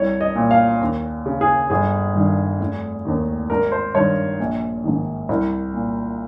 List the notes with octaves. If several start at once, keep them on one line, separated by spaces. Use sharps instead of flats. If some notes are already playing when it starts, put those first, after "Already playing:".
Already playing: C2 C#5
D#5
A#2
F5
D#2
C#3
G#4
G1 G#4
G2 D#3
F1
D#2 D#3
G#1 A#4
C5
G2 D#3 C#5
A#1
G#2 D#3
C2
A#2